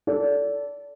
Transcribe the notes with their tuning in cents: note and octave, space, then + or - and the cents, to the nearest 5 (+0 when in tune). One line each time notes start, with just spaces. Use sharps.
A4 +0 D5 -30